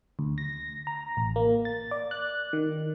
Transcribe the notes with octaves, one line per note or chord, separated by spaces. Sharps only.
D2
A#6
A#5
A1
A#3
A6
D5
F#6
D#3